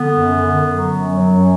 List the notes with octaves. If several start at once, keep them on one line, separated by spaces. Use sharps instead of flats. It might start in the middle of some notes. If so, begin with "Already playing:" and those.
Already playing: D3 B3
F#2
D3
D3
F#3
F#2
F#3
F#2